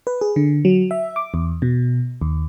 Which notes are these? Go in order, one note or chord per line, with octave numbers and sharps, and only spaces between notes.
B4
G#4
D3
F#3
E5
D6
E2
B2
D#2